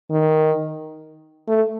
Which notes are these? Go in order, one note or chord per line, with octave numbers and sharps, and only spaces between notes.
D#3
A3